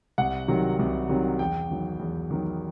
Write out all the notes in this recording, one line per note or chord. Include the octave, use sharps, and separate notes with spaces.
C2 F#5
C3 D#3 F#3
C2
C3 D#3 F#3
E2 G5
D#3 F#3
E2
D#3 F#3